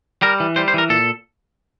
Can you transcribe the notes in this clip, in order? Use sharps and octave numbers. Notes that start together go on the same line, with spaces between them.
G3 A#4
E3
G3 C5
C5
E3 A#4
A#2 A4